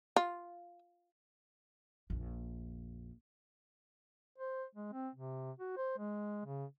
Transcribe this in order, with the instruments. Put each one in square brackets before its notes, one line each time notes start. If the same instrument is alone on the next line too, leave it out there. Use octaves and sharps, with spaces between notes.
[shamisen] F4
[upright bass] A#1 F2
[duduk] C5
G#3
C4
C3
F#4
C5
G#3
C#3